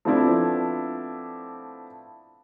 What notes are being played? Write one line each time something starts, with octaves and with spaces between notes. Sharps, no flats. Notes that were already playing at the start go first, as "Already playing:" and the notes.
F3 A3 B3 C4 D4 E4